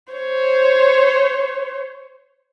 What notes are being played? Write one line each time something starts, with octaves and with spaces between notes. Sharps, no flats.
C5 C#5